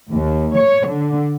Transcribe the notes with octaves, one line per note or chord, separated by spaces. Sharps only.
D#2
C#5
D3